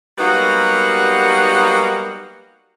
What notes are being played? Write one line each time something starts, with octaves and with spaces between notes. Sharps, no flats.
F#3 G3 A#3 B3 D#4 F#4